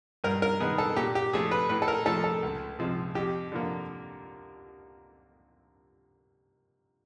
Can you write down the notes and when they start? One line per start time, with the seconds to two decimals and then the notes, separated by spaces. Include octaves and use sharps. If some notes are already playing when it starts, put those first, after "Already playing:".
0.24 G2 A#4
0.42 A#4
0.60 D#3 G#3 B3 G#4
0.78 A4
0.96 A#2 G4
1.15 G4
1.33 F3 A3 G#4
1.51 B4
1.69 A2 B4
1.82 A4
1.88 A#4
2.06 F3 A3 A4
2.24 A4
2.43 C#2
2.79 C3 F3 G#3
3.15 F2 G4
3.52 D3 F3 A#3